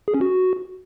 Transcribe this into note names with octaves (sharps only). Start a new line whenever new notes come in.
G#4
C#4
F#4